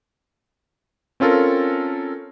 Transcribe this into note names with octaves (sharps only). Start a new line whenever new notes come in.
C4 C#4 F4 A4 A#4